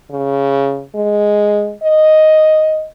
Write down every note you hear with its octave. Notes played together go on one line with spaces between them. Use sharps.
C#3
G#3
D#5